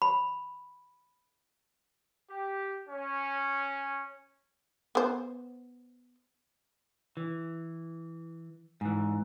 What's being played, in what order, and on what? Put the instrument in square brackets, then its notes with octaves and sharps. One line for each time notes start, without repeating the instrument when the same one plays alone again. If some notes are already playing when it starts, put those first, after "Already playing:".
[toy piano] B5
[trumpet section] G4
C#4
[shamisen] B3 C5
[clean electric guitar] E3
G#2 E3